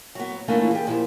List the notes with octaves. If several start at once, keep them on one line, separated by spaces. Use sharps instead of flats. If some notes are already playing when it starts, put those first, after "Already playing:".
F#3 B3
E3 A3 A#3 C#4 D4 F4
G4 G#4
A#2 E3 F3